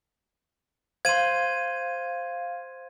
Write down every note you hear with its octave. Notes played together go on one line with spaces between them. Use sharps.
C5 F5 C6 G#6 D#7